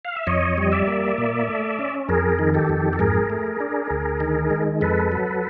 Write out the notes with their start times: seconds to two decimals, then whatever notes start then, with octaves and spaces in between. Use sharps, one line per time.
0.05 F5
0.17 E5
0.27 F2 C#5 D#5
0.58 G3 D#5
0.72 D5 E5
0.87 A#3
1.18 A#2
1.48 A3
1.79 C#4
2.09 F2 G#4 A#4
2.39 D#3
2.54 G4 A4
2.69 F2
2.93 A4
2.99 G#2 G#4 A#4
3.30 A3
3.60 D4
3.91 D2
4.20 D#3
4.51 G#3
4.81 F2 A4 B4
5.12 F#3